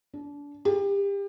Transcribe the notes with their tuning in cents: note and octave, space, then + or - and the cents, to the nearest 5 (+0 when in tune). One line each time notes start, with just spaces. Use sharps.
D4 -30
G4 +30